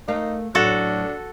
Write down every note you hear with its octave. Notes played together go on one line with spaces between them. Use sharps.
A3 D#4 A#4 F5
A2 F#3 D4 F#4 A4